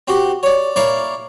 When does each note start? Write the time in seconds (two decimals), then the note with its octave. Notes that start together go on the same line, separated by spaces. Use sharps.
0.08 C4 F#4 G4
0.43 C#5 D5
0.76 A#3 E4 C#5 D5 F5